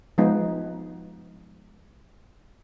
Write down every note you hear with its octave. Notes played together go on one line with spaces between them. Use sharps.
F3 G#3 B3 D#4